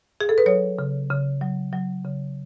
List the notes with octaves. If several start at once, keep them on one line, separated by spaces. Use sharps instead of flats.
G#4
A4
B4
F#3 C#5
C#3
C#3
F#3
F#3
C#3